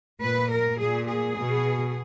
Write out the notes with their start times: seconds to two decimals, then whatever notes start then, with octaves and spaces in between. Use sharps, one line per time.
0.22 A#2 B4
0.51 A#4
0.80 A#2 G#4
1.08 G#4
1.37 B2